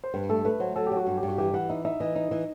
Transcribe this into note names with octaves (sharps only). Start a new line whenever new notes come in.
C5
G2 B4
A3 A4
A3 B4
F#3 C5
F#3 A4
F#3 G4
F#4
G2
G4
G2
F#4
E3 G4
E3 F#5
D#4 E5
D#4 E5
E3 D#5
D#4
E3